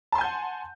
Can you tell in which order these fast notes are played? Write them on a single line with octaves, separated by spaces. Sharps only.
A5 C6 G#5 G6 F#5